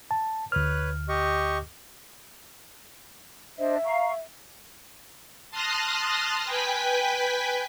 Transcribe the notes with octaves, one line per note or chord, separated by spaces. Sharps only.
A5
D2 B4 C#5 F6 F#6
G4 D#5 C#6
D4 C5 D#5 E5
F5 A#5 C#6
A5 C6 D#6 F6 F#6 A#6
B4 G5 G#5 B6